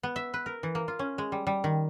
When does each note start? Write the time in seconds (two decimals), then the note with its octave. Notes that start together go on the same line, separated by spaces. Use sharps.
0.03 B3
0.16 E5
0.34 B4
0.46 A#4
0.63 E3
0.75 A#3
0.88 F4
0.99 C#4
1.18 G#3
1.32 G3
1.47 G3
1.64 D#3